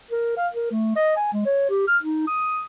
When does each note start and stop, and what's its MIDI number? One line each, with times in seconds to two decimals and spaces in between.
0.11 0.37 70
0.37 0.48 77
0.53 0.71 70
0.72 0.96 57
0.96 1.12 75
1.16 1.31 80
1.33 1.43 56
1.45 1.67 73
1.70 1.85 67
1.87 1.97 89
2.02 2.24 63
2.27 2.65 87